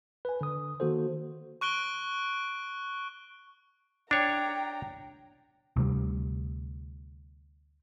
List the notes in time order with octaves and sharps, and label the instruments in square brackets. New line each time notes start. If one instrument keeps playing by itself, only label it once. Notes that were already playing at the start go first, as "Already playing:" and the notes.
[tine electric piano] B4 G#5
D3 D#6
D#3 A#3 F#4 A4 C5
[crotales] C#6 F#6 D7 G7
[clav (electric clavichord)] D4 C#5 [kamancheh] G5 A#5
[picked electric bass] D2 C3 G3